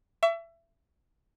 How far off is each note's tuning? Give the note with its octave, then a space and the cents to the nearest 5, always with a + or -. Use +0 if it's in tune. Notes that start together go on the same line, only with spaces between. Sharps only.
E5 +25 C#6 +40